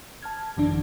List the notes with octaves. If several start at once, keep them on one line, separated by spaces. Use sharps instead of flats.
A5 F6 G#6
G#1 F#2 D3 E3 D4